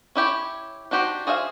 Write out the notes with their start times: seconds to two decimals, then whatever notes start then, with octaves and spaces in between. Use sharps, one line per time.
0.15 C#4 E4 G4 C#5
0.91 D4 D#4 F#4 G4 C5
1.27 F#4 G#4 C5 E5 F5